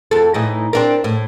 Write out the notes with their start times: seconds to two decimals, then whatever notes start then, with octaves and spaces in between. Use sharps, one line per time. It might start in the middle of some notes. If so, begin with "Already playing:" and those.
0.11 F2 A4
0.34 A2 E3 D#4
0.73 C4 D4 A#4
1.04 A2